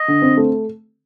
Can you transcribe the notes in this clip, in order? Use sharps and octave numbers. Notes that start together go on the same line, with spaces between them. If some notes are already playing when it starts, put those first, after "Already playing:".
Already playing: D#5
D3
C4
A3